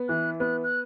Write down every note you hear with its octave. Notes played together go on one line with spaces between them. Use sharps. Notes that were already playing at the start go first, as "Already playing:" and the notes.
Already playing: B3
E3 F#6
B3 F#6
F#6